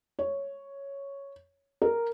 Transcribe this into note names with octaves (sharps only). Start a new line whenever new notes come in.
C#5
A#4